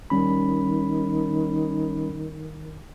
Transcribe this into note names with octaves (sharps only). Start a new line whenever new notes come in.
D#3 G3 C#4 B5